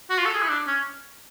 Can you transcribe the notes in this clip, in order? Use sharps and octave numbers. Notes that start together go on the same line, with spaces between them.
F#4
F4
A4
G#4
E4
D4
C#4